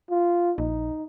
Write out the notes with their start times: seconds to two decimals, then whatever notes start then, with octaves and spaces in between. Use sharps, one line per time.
0.10 F4
0.58 A#1 D#4